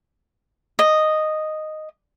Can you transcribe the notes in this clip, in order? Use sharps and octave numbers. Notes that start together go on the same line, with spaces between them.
D#5